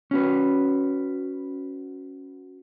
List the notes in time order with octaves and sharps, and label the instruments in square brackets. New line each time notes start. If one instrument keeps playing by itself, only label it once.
[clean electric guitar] C#4 F#4 B4